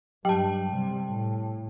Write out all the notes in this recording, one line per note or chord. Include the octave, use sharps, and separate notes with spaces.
G2 F#3 G4 G5 A5
C3 G3
A2